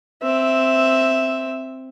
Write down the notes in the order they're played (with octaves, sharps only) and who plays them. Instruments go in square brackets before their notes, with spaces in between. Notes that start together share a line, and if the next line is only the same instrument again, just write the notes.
[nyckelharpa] C4 E5